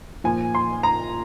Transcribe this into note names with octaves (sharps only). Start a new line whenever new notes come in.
A#2 F3 G#5
C6
A#5